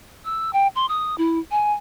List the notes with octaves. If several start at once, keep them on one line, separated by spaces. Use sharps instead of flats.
E6
G5
C6
D#6
E4
G#5